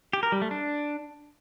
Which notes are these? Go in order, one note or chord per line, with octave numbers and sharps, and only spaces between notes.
G4
A#4
G3
A3
D4